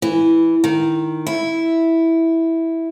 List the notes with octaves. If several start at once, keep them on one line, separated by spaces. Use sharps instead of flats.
E3
D#3
E4